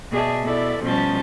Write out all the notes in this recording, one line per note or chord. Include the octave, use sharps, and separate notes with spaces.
B2 G#4 D5 E5 A5
B2 E4 A4 D5
B2 F3 G3 C#4 A5 G6